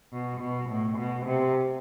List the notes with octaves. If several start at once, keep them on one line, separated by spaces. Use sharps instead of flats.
B2
B2
A2
B2
C3